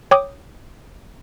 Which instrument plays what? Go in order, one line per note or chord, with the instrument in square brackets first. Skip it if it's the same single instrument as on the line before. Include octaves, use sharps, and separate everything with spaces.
[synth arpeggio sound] C#5 G5 D6 D#6